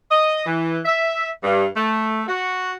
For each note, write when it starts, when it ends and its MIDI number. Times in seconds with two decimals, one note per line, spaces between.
0.11 0.42 75
0.46 0.79 52
0.86 1.28 76
1.44 1.66 43
1.76 2.23 57
2.27 2.72 66